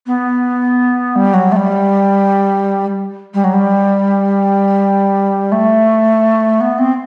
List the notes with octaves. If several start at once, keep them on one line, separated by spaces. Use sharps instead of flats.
B3
G3
F#3
A3
G3
G3
F#3
G3
A3
B3
C4